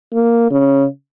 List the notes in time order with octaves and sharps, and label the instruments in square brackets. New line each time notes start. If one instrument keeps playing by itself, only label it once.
[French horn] A#3
C#3